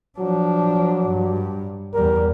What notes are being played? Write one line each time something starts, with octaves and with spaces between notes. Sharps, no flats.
F3 F#3 D4
G2
E2 G3 A#4